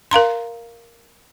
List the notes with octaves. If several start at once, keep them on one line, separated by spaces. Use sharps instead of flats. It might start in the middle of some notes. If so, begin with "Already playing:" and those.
A#4 F5 A#5 C6